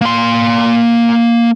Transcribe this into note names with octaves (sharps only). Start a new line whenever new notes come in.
A#3 C6